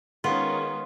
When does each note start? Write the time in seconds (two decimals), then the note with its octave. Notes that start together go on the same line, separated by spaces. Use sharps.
0.24 D#3 G#3 B3 C#4 F4